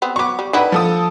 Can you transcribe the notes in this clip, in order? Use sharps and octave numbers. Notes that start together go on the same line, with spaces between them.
B3 C4
F#3 B3 C#6 D6
G3
D#3 D4 E4 B4 F#5
F3 A4 D#6